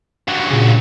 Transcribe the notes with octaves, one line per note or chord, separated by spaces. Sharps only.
G2 F#3 F#5
A#2 C#3